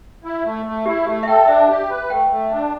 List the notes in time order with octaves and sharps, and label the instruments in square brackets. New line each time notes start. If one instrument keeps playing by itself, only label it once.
[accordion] E4
A3
A3
[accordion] E4 [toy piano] G4
[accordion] A3 [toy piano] G4
[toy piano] E5
[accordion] A4 [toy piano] G5
[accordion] D4 [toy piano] E5
[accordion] G4
B4
[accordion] A3 [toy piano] G5
[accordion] A3
D4